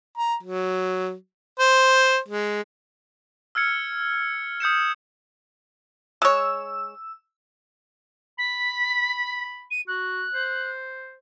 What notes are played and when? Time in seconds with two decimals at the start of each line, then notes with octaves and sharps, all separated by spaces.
0.17 A#5
0.43 F#3
1.59 C5
2.28 G#3
3.55 E6 F6 G#6 C#7
4.60 D#6 G6 C#7 E7
6.22 G#3 C#5 E6
8.38 B5 B6
9.71 D#7
9.88 F#4 F#6
10.34 C5